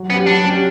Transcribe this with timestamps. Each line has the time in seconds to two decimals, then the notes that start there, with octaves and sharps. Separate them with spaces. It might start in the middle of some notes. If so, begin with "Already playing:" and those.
Already playing: F#3
0.10 B3 C#4
0.14 G4
0.26 F#3 D4
0.44 C#4 G4